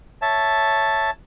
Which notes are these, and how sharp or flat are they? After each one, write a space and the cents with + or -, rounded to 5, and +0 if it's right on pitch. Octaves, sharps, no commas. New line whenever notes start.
C#5 +0 E5 +0 A5 +0